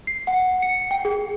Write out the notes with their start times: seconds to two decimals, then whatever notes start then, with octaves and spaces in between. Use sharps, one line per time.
0.07 C7
0.27 F#5
0.62 C#7
0.91 G5
1.05 G#4